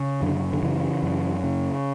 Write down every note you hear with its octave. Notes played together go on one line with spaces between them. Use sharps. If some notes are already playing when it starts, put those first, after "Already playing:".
Already playing: C#3
F#2 D3
D3
C#3 E3
F#2
C#3